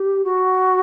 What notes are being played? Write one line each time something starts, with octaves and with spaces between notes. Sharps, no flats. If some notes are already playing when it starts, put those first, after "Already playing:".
Already playing: G4
F#4